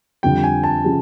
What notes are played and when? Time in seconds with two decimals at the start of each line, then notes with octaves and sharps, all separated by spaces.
0.23 F2 D3 G3 G5
0.44 G#5
0.64 A5
0.84 C#3 F3